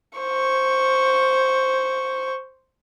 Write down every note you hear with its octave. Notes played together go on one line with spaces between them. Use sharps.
C5 C#6